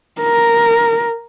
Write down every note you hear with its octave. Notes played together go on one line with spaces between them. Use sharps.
A#4